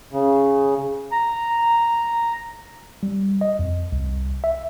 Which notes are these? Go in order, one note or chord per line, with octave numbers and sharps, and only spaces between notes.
C#3
A#5
G3
D#5
F2
C2
E5